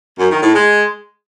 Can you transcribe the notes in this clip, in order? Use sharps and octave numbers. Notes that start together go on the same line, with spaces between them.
F#2
D#3
A2
G#3